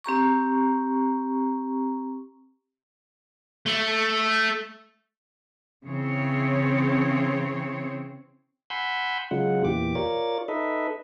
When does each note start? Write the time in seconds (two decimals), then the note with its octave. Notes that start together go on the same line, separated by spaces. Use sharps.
0.04 C4 G4 A#5 C#6
3.66 A3
5.85 C#3 E3 C4 C#5
8.70 F#5 G#5 B5 C6 E6 G6
9.31 C#3 F#3 G#3 F4 F#5
9.65 E2 A#2 E3 G4 D6
9.95 F4 A#4 C#5 D5 A6
10.48 D#4 A4 B4 D#5 E5